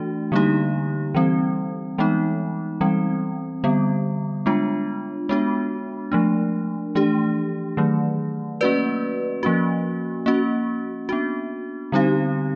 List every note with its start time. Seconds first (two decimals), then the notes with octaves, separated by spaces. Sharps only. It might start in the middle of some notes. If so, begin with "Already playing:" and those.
Already playing: E3 A3 D4 F#4
0.32 D3 G3 A#3 D#4 G4
1.15 E3 G3 C4
1.98 E3 G#3 B3 D#4
2.81 E3 G3 C4
3.64 D3 G3 B3
4.46 G#3 B3 D4 F4
5.29 G#3 B3 D4 F#4
6.12 F3 A3 D4
6.95 E3 A3 D4 G4
7.77 D#3 F#3 A3
8.61 A#3 C#4 F#4 B4 D5
9.43 F3 A#3 C#4 F#4
10.26 A#3 C#4 F#4
11.09 B3 D4 F#4
11.92 D3 G3 C4 D#4 G4